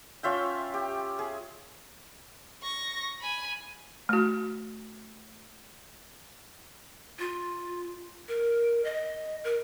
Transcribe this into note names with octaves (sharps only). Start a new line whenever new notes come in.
C#4 F4 E5 G5
G4
G#4
C#6 A#6
G#5 B5
A3 F#4
F4
A#4
D#5
A#4